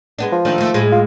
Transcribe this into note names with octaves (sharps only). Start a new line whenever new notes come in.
G#3 B3 D4
F3
D#3 A3 D4
D#3 A3
A2 G#3 G#4
F4